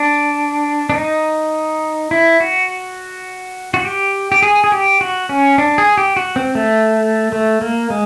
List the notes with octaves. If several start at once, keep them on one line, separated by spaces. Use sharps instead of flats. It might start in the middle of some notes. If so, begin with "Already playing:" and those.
Already playing: D4
D4
D#4
E4
F#4
F#4
G4
G4
G#4
G#4
G4
F#4
C#4
D4
G#4
G4
F#4
C4
A3
A3
A#3
G#3